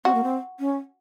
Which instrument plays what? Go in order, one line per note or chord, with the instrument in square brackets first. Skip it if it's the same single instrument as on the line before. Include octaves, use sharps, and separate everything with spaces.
[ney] C4 [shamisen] F#4
[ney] A#3
C4
C#4